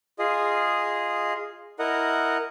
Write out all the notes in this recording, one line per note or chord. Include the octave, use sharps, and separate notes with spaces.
F4 G#4 D#5
E4 A#4 D#5 F#5